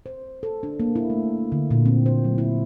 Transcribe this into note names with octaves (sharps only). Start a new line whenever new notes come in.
C5
A4
D4
A#3
E4
A3
D3
A#2
C4
C5
F#3
E4